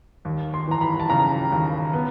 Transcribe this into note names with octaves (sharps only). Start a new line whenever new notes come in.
D#2
C6
E3 A#5
B5
A5
C#3 A#5
D#2
B3